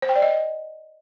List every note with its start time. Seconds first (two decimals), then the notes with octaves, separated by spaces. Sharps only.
0.02 C5
0.09 G5
0.16 D5
0.22 D#5